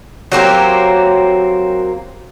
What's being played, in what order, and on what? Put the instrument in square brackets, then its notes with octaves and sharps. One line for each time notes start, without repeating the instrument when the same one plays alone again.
[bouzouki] F#3 A#3 C4 G4